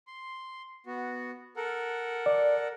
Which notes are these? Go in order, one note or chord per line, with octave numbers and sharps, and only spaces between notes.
C6
B3 F#4
A4 A#4 F#5
D5